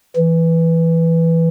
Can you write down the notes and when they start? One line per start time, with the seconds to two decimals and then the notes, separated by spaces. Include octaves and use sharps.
0.17 E3